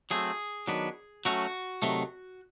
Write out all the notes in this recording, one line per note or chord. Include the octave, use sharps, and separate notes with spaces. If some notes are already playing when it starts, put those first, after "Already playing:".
F#3 A3 C4 G#4
D#3 F#3 B3 D4
F#3 A3 C#4 F#4
C3 D#3 F#3 A3